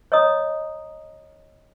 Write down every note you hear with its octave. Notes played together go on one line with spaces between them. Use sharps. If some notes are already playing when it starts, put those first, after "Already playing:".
C#5 D#5 A#5 D#6